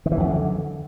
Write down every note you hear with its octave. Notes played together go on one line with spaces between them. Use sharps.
D#3
E3
E2
F#2
D3